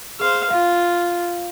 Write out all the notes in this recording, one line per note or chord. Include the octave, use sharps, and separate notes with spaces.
G#4 C5 F5
F4 F5